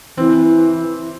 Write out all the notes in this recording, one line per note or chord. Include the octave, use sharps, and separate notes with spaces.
E3 C4